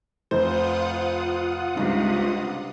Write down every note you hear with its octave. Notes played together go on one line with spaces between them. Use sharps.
F1 F4 C5 F#5 D#6
C#2 G2 C3 D#4